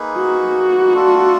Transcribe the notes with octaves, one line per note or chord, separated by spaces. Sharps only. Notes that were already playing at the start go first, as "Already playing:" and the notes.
Already playing: A#3 D#4 G#4 B4
F#4
A3 D4 F4 A4